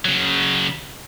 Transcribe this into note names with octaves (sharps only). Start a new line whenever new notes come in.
C#3 F#3